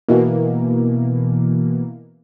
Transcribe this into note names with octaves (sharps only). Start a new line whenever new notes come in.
B2 E3 A#3